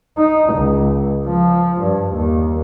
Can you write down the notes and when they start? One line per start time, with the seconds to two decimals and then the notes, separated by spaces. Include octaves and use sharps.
0.17 D#4
0.54 C#2
1.27 F3
1.81 G2
2.14 D#2